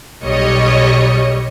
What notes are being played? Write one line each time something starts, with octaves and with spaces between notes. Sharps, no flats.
B1 G3 C#5 D#5